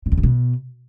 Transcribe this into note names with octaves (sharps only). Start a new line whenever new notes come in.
A#2
E2
G#2
B2